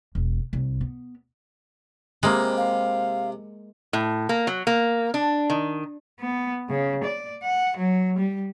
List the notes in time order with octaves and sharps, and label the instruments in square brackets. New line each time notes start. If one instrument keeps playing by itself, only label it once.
[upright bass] E1
C2
B3
[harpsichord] C3 B5 [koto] G#3 A#3
[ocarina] F5
[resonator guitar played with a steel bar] A2
A#3
F#3
A#3
D4
D#3
[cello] B3
C#3
D5
F#5
F#3
G3